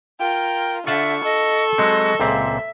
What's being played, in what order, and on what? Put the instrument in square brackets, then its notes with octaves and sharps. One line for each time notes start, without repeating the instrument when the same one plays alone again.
[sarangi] F4 [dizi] A#4 [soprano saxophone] G5
[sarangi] D3 [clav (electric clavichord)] F4 F#5 A5 [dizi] E5 [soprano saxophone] C#6
[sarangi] A4 [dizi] D#5
[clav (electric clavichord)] F#3 G#3 C4 [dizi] D#5
[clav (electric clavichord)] C#2 A#2 C4 [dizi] E5